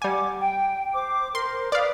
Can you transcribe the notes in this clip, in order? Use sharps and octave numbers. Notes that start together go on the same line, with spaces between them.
G3 F#5 G#5 D6
G5
C5 D6
A#4 C5 C6
B4 D5 F5 D#6